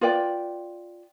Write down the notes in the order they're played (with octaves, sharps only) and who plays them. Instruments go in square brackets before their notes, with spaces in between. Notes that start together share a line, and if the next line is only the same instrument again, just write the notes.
[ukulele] F4 B4 D5 G5